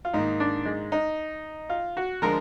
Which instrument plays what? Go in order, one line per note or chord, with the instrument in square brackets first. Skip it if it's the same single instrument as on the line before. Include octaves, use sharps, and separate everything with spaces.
[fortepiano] F4
[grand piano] G#2 D#3 A#3 [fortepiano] D#4
[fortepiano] D4
G#3
D#4
F4
F#4
[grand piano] D3 F3 G#3 [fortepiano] A#4